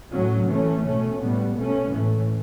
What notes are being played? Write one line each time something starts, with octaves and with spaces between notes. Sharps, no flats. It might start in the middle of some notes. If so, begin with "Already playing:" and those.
A2 F#3 C#4
E3 A3 C#4
B2 A3 C#4
A2 G3 B3
B2 A3 C#4
A2 E3 A3